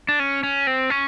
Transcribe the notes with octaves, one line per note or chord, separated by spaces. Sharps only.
D4
C#4
C#4
C4
C#4